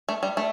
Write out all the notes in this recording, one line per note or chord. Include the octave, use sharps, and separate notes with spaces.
A3
G3
A3